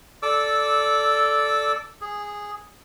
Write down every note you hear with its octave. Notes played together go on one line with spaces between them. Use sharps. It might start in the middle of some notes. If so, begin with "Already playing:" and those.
A4 D5 D6 E6
G#4